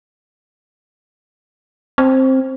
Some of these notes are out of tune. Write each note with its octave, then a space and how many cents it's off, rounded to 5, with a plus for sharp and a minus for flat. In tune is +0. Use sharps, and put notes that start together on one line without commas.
C4 +10